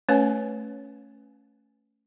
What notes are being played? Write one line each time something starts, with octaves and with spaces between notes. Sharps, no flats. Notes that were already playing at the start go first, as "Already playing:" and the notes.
A3 C#4 B4 C#5 G#5